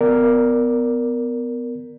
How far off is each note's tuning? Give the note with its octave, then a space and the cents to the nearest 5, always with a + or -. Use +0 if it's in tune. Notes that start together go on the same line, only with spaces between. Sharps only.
B3 +20 A#4 -5 D5 +0